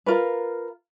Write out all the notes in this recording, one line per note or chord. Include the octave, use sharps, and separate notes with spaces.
F4 A#4 B4